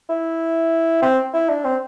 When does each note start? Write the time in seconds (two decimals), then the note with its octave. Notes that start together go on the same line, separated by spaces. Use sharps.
0.09 E4
1.02 C4
1.33 E4
1.49 D4
1.65 C4